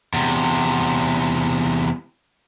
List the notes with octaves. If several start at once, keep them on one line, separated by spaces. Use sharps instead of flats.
E2 C3